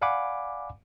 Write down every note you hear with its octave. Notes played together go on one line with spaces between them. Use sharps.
D5 F5 F#5 G#5 B5 D6